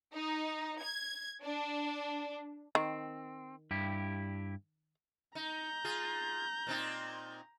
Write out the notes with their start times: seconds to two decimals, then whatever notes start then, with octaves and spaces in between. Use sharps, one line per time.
0.14 D#4
0.82 G#6
1.43 D4
2.75 D#3 C4
3.71 G2 E4 G4
5.35 D#4 A#5 G6
5.85 F4 G#4
6.67 A#2 C4 D#4